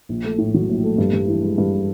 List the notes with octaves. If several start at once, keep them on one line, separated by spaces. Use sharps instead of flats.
A#1
A3
A2
F#3
A#1
A3
G2
G2
E3
G#3
G2